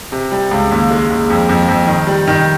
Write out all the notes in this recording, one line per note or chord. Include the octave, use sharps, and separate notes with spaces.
C3
G3
C#2
D#2
G#3
D#2
F2
F2
F2
D#3
G3
D#3